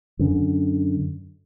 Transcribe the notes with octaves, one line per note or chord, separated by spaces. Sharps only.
F#2 D3